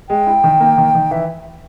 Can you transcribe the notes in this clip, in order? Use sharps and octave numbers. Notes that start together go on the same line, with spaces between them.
G#3 G5
E4
D#3
A#3
D#3
D#3
E3 E5